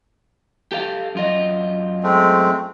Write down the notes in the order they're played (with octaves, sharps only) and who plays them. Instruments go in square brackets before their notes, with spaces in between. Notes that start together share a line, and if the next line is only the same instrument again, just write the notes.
[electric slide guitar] G4 A4 F5
F#2 F4 D#5
[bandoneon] G#3 A3 C4